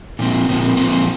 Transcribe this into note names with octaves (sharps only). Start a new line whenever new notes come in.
A#2 F3 C4
A#2 F3 C4
A#2 F3 C4